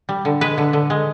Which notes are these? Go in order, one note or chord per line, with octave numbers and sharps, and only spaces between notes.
G3
D3
G#3 B4
D3
D3
G#3